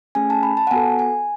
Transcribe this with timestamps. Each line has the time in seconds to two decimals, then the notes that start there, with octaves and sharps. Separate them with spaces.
0.15 A3 C#4 G#4 G#5
0.30 A5
0.43 B5
0.57 A5
0.67 F#5
0.71 B3 F#4 A4 G#5
0.99 G#5